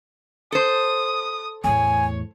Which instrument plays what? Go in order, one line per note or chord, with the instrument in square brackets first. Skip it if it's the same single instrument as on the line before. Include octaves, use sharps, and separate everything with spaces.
[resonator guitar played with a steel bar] A4 C5 [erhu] D#6
[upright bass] E2 A2 [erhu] C#5 [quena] G#5